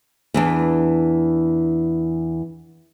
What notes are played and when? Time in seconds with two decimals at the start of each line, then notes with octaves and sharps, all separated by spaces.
0.34 E2 E3 D4